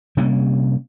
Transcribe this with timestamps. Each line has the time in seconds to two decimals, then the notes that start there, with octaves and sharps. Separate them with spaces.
0.17 C3 G3 A#3 C#4